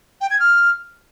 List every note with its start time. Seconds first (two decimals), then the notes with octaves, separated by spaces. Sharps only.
0.21 G5
0.30 G#6
0.39 F6